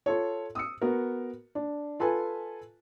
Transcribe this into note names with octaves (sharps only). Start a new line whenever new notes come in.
F4 A4 C#5
D#6 E6 C#7
B3 F#4 A#4
D4
F4 A4 B4 G#5